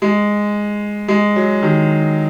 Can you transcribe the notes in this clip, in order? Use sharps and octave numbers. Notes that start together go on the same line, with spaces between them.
G#3
G#3
F#3
D#3